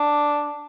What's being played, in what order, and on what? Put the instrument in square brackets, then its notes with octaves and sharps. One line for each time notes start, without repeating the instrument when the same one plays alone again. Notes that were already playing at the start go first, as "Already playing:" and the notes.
Already playing: [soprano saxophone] D4